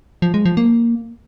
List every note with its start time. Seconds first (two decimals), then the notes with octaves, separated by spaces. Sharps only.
0.22 F3
0.34 G#3
0.45 F3
0.57 A#3